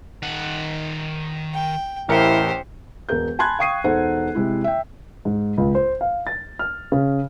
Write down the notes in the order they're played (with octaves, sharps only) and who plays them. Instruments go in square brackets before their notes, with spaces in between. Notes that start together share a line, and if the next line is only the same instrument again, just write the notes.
[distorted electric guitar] D#3 F#5
[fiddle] G5
[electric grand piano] A1 A#4 C#7 [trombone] E4 [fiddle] G4 C5
[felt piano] E1 A#4 G6
G#5 A5 B5 C6 F#6 G#6
F5 G5 C#6 D#6 C7 D#7
E1 D#4 A4 C5 F#5
C3 G#3 E4
E5 G5
[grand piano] G#2
C#2
C5
F5
A6
F6
C#3